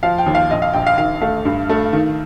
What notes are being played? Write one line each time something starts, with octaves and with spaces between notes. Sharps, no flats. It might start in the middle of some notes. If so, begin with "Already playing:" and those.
F3 F5
G5
D#2
F5
A#1 D#5
F5
A#1 G5
F5
D#3 F5
A3 F5
G2
A3
D#3